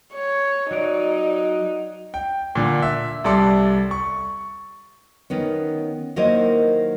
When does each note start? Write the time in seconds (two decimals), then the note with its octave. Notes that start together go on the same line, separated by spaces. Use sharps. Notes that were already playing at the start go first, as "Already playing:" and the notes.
0.14 C#5
0.71 F#3 D#4 D5
2.14 G5
2.55 A#2 D3
2.82 E5
3.24 C2 G3 A4 D5 C6
3.91 C#6
5.30 D#3 B3 C#4
6.16 D#3 F#3 A#3 E4 C5 D#5